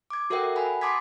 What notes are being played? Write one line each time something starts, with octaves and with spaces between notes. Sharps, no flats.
D6 G#6
F#4 A4 A#4 E5 F#5 G5
F#5 G#5 B5
A5 C6 D6 D#6 G#6 B6